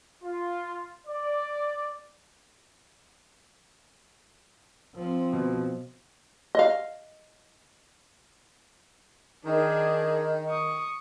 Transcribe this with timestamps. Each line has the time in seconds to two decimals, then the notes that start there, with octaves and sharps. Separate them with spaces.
0.23 F4
1.07 D5
4.95 F3 C4
5.33 B2
6.55 D#5 F5
9.46 D#3 D4 G#4
10.49 C#6 D#6